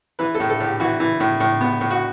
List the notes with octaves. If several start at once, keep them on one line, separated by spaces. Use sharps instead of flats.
E3 B4
A4
A2
A4
A2 G4
E3 F#4
E3
A2
A2
B3
A2
F#4